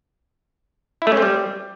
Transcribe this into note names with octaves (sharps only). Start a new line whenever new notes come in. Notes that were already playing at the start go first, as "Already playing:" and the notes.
E4
A3
C#4
C4
G3